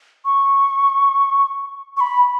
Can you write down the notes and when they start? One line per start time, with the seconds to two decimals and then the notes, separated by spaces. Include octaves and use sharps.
0.25 C#6
1.97 C#6
2.01 B5